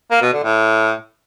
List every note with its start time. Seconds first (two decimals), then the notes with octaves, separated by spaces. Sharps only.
0.11 A#3
0.22 B2
0.33 D3
0.43 A2